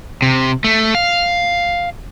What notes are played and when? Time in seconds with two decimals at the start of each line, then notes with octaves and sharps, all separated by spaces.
0.22 C3
0.64 A3
0.95 F5